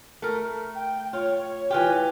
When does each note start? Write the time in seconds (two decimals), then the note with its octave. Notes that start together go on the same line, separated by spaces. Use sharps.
0.22 A3 A#4
0.75 G5
1.13 F4 C#5
1.70 E3 F4 G4